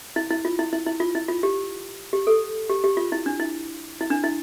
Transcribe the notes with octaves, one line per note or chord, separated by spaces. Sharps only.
E4
E4
F4
E4
E4
E4
F4
E4
F4
G4
G4
A4
G4
G4
F4
E4
D4
E4
E4
D4
E4